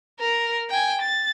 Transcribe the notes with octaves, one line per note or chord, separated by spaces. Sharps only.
A#4
G5 G#5
A6